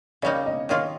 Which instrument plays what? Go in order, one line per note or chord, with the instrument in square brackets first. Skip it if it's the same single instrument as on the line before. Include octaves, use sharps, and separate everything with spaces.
[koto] C#3 G3 A#3 D#4 [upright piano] C#5
[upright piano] D#5
[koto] D#3 A#3 F4 G#4 [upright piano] C#5